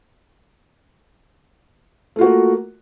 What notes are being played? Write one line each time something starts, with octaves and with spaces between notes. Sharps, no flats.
A3 A#3 F4 F#4 A#4